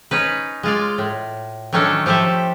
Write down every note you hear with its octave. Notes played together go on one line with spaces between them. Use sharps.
C#4 D#4 B4
G#3 F4 D5
A2
D#3 F#3 A3 C#4 D4 A4
F3 G4 A4 C5 E5